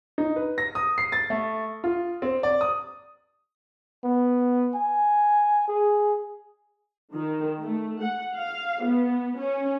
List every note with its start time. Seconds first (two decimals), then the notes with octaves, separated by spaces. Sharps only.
0.18 D#4
0.36 B4
0.58 A#6
0.75 D#6
0.98 C7
1.12 A6
1.30 A3
1.84 F4
2.22 C4
2.43 D5
2.61 D#6
4.04 B3
4.75 G#5
5.68 G#4
7.14 D#3
7.60 A3
8.02 F#5
8.35 F5
8.84 B3
9.39 C#4